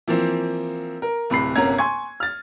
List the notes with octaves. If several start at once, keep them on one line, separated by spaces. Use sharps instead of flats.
E3 F3 A#3 C4
A#4
D1 C3 B5 C7
G1 C3 A#3 C#4 A#5 G#6
G#5 C6 C#6 G#6
F6 A6